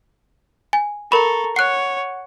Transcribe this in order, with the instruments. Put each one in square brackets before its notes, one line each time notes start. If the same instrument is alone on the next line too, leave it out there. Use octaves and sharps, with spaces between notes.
[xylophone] G#5
[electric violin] A4 [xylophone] A#4 B5 [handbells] A#5 C#6
[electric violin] C#5 [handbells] F#5 [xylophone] F#6 C7